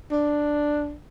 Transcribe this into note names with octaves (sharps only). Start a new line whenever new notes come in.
D4